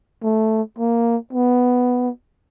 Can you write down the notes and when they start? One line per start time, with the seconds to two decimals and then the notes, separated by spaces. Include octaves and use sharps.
0.23 A3
0.78 A#3
1.33 B3